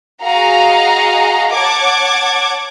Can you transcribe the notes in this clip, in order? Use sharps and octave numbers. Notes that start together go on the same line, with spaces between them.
F#4 G#4 D#5 F5 A#5
C#5 F#5 A5 D6 G#6